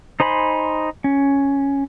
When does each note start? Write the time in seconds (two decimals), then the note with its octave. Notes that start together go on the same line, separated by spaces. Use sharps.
0.20 D#4 C5 G#5 B5 C6
1.04 C#4